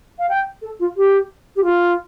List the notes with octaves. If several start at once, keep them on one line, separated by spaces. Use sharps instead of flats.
F5
G5
A4
F4
G4
G4
F4